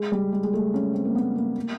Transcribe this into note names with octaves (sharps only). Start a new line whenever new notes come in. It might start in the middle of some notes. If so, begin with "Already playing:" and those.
Already playing: G#3
G3
G#3
G#3
A3
C#4
C4
A#3
B3
A#3
A#3